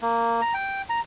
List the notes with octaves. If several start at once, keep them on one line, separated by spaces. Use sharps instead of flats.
A#3
A#5
G5
A#5